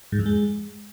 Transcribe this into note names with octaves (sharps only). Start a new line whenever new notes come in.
G#2
F2
G#3